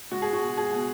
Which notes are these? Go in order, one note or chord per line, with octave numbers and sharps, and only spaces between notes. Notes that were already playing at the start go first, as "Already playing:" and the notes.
G#3 F#4
G#4
F#4
B2
G#4
B2